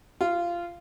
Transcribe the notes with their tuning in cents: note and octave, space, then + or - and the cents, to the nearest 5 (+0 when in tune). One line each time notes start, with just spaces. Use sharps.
F4 -15